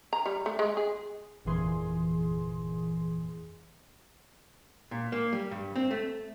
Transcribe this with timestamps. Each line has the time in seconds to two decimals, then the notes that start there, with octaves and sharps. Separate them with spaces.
0.13 A#5
0.26 G3
0.46 A3
0.59 G#3
0.77 G#4
1.45 G1 F2 A#2 E3 G#4 C6
4.91 A#2
5.12 A#3
5.33 G3
5.51 G2
5.76 C4
5.91 A3